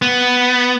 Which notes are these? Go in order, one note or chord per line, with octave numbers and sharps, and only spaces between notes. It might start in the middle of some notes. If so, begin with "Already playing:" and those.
B3